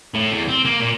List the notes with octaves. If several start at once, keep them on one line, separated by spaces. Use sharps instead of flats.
A2
E2
C4
A#3
A#2